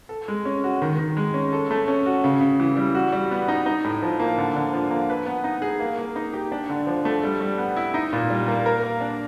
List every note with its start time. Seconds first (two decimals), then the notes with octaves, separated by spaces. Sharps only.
0.09 A4
0.28 G#3
0.45 C#4
0.64 F#4
0.82 D#3
0.98 D#3
1.17 G#3
1.34 C#4
1.53 A4
1.71 A3
1.88 C#4
2.06 F#4
2.24 C#3
2.41 C#3
2.60 E3
2.77 G3
2.95 F#4
3.13 G3
3.31 B3
3.48 D#4
3.66 D#4
3.84 A2
4.02 F3
4.19 A#3
4.38 D3
4.56 D3
4.73 F3
4.91 A#3
5.10 B4
5.26 B3
5.44 D#4
5.62 G#4
5.80 A#3
5.99 A#3
6.16 D#4
6.33 G4
6.52 D4
6.69 D3
6.87 F3
7.05 A3
7.23 G3
7.41 G3
7.58 B3
7.76 E4
7.94 D#4
8.13 A#2
8.30 G3
8.48 A#3
8.66 A#4
8.84 A#3
9.01 D4